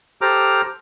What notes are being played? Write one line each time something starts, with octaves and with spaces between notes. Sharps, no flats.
G4 A4 C5 A#5 D6 F6